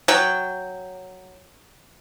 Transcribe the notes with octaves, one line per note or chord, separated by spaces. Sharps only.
F#3 G5